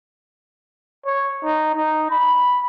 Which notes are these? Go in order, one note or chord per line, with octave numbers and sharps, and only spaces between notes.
C#5
D#4
D#4
B5